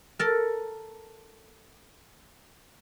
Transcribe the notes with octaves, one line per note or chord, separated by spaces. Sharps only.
A4 A#4